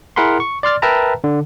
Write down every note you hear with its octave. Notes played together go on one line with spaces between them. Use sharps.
E4 G#4 A#4 F#5 B5 C6
C#6
D5 C6 F6 A6
A#4 B4 E5 G5 A5 A#5
D3